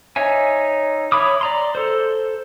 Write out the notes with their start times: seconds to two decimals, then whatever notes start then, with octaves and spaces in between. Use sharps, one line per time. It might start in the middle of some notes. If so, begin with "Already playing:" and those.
0.16 D#4 C#5 E5 G#5
1.12 C#5 E5 B5 D6 D#6
1.41 D5 A#5 C6
1.75 A4 C5